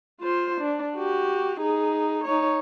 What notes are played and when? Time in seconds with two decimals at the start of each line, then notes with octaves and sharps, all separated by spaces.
0.20 F4 C5
0.61 D4
0.97 F#4 G4
1.60 D#4 G#4
2.24 D#4 C#5